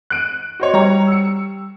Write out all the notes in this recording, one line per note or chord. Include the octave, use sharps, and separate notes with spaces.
F#6 D7 D#7
F#4 C5 C#5
G3 C#5 A#5
E6 C#7